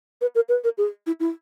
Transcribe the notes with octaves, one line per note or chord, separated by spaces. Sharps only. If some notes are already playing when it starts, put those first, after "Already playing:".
B4
A#4
B4
A#4
G#4
E4
E4